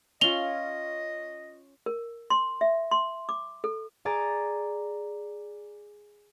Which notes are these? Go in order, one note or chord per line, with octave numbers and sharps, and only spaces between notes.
C#4 F4 D#5 F7 G7
A#4
C6
E5
C6
D6
A4
G#4 D5 A#5 A6